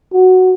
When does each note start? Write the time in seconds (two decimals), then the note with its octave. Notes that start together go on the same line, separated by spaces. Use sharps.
0.13 F#4